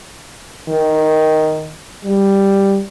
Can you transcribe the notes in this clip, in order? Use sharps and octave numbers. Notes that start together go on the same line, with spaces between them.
D#3
G3